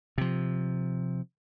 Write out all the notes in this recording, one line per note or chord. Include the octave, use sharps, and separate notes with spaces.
C3 F3